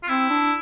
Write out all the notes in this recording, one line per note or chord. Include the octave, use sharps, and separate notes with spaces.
F4
C4 E4
D4